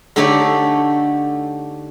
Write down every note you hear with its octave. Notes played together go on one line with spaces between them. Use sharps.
D3 A3 D#4 G4 C#5 D5